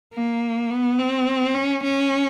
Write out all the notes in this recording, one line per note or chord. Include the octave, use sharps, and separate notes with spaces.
A#3
B3
C4
C#4
C#4